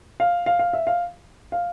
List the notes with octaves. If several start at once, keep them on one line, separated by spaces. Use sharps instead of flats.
F5
F5
F5
E5
F5
F5